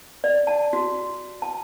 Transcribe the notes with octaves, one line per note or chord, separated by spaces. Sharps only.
D5
A5
F#4
A5